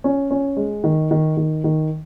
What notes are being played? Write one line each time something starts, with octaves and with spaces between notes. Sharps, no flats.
C#4
C#4
G#3
D#3
D#3
D#3
D#3